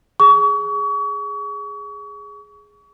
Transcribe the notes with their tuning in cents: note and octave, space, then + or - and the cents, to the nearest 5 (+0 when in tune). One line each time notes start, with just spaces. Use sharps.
G#4 +0 C#6 +35